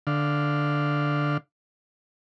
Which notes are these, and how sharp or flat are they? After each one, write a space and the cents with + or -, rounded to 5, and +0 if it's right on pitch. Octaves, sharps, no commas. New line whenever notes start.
D3 +0 F5 +0